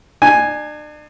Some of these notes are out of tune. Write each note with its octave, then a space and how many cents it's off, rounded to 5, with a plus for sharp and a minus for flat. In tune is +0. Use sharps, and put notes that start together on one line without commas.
D4 +40 G#5 +0